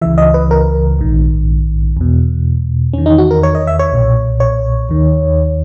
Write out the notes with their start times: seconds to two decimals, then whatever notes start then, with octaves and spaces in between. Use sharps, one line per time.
0.01 C#2 C#3 E3 E5
0.18 D#5
0.34 B4
0.51 A#4
0.99 A#1 G#2 D#3
1.97 E2 B2
2.93 E2 D#3 C#4
3.06 D#4
3.18 F#4
3.31 A#4
3.43 C#5
3.55 D#5
3.67 E5
3.79 C#5
3.92 B1 A#2
4.40 C#5
4.89 D#2 D#3